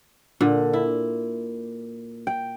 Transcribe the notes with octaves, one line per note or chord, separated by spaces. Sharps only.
A#2 D3
E4
G5